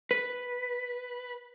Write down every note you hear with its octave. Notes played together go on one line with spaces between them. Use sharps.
B4